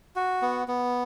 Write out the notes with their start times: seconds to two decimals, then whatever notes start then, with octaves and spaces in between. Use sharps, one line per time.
0.16 F#4
0.42 B3
0.68 B3